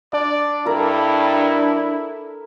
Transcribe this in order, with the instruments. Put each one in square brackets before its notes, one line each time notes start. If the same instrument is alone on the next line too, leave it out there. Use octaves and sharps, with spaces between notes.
[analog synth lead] D4 [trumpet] D5
[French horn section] G2 [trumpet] E4 [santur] A4 A#4